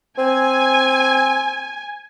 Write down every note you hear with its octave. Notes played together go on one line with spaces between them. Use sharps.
C4 G#5